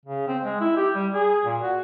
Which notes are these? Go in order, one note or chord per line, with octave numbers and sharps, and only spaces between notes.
C#3
C4
G#3
E4
G4
G3
G#4
A#2
F#4